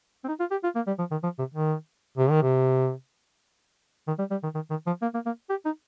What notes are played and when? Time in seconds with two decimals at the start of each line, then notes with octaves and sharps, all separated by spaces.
0.24 C4
0.28 D#4
0.40 F4
0.51 G4
0.64 F4
0.75 A#3
0.87 G3
0.99 F3
1.11 D#3
1.23 F3
1.39 C3
1.54 D#3
2.18 C3
2.30 D#3
2.43 C3
4.07 D#3
4.19 G3
4.31 G3
4.43 D#3
4.55 D#3
4.70 D#3
4.86 F3
5.02 A#3
5.14 A#3
5.26 A#3
5.50 G4
5.65 D#4